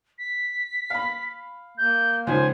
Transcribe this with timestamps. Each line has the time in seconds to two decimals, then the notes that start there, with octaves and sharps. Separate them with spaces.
0.18 B6
0.90 F5 B5
1.78 A#3 G6
2.27 C#2 D#3 F3 C5 G#5